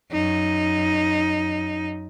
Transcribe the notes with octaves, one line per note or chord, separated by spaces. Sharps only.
F#2 D#4